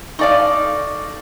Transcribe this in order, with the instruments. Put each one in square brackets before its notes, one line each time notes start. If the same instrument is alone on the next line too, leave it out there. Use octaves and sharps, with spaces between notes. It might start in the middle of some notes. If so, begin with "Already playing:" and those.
[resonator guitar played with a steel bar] D#4 A4 F5 [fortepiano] D5 C#6